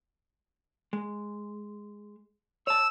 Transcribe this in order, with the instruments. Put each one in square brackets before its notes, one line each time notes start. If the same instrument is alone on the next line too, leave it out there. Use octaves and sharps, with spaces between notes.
[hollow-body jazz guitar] G#3
[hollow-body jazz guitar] C#5 A5 [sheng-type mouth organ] E6